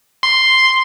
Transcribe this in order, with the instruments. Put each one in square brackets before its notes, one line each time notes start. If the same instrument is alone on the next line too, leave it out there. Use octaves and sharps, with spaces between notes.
[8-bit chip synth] C6